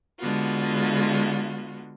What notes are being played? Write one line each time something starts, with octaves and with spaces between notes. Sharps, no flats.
D3 G#3 B3 F4 F#4